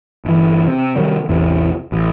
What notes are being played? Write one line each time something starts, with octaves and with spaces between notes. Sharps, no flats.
G1 E3
C3
C3 D#3 F#3 G3
A1 E2 C3 E3
A1